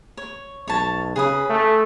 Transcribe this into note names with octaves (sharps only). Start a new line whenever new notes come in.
C#5
B1 C#5 A5
C#3 G#4 B4 D#6
A3